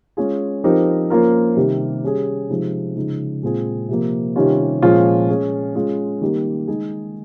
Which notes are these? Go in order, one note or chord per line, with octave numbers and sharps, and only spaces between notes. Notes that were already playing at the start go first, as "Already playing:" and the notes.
G#3 C#4 F4 G#4
F3 C4 D#4 G4 A#4
F3 A#3 C#4 F4 A#4
C3 D#3 G3
G3 C#4 G#4
C3 F3 G#3 D#4
C#3 F3 G#3 D#4
A#2 G#3 C4 F4 G#4
C3 F3 A#3
C3 D#3 G3 C#4 F4
A#2 F3 G#3 C#4 F4
G#3 C#4 G#4
G#3 C#4 F4
D#3 G3 A#3
D#3 G#3 D#4 G#4